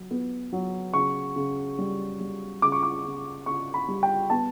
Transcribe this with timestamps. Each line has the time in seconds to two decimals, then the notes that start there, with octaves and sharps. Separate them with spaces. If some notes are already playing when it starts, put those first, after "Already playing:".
Already playing: F#3
0.11 B3
0.52 F#3
0.94 C#3 C#6
1.36 C#3
1.78 G3
2.20 G3
2.62 C#3 D6
2.72 C#6
2.83 D6
3.04 C#3
3.46 C#3 C#6
3.74 B5
3.88 G3
4.03 G5
4.30 B3 A5